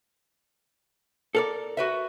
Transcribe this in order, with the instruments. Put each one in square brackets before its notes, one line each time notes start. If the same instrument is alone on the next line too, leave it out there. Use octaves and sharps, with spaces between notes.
[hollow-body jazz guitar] A4 A#4 D5
[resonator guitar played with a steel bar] F#4 B4 E5